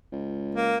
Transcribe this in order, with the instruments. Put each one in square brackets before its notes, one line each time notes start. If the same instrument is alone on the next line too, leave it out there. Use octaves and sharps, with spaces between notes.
[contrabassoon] C#2
[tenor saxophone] A#3